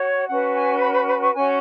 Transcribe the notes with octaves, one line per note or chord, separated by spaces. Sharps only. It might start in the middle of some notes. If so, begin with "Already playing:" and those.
Already playing: F#4 C#5
C#4 F#4 B4 F#5
G#5
B5
B5
B5
C#6
C#4 F#4 C#5 G#5